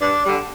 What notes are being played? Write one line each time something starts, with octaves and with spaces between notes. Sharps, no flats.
G2 D4
D3 G3